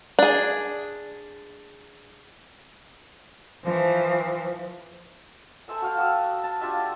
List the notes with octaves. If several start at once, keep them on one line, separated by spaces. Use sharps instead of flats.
D4 G#4
E3 F3
A4 C5 E5 G#5
F#4 F5 G5
F#4 B5 D#6 E6
A5
D4 F4 G4 E5